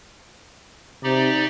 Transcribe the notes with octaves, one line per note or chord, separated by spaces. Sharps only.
C3 D#4 G4 D5